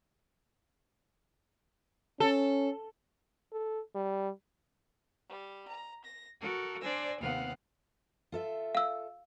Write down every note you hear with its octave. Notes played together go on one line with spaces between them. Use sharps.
C#4 A4
A4
G3
G3
A#5
A#6
F#4 A4 A#4
D4 C5 D5 G#5 E6 A#6
D#2 C3 B3 F5 F#5
F4 A4 E5
F5 E6